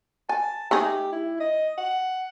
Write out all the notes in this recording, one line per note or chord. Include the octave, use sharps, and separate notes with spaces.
G#5 A5
A3 D#4 G4 G#4
E4
D#5
F#5